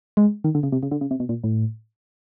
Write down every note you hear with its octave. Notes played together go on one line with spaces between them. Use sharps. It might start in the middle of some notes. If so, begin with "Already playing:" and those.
G#3
D#3
D3
C#3
C3
C#3
D3
C#3
C3
B2
A#2
A2